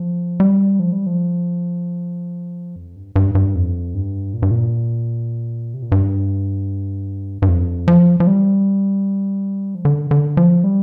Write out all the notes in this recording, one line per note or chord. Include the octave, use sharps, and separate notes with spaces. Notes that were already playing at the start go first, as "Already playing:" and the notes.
Already playing: F3
G3
F3
G3
F3
F2
G2
G2
G2
F2
G2
A#2
G2
A#2
C3
A#2
G2
G2
F2
F3
F3
G3
F3
D3
D3
F3
G3